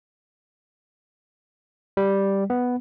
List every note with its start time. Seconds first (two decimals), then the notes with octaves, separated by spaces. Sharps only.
1.97 G3
2.50 B3